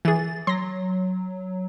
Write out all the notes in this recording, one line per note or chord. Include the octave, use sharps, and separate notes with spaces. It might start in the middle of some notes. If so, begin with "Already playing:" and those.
E3 G#4 A6
F#3 C6 A#6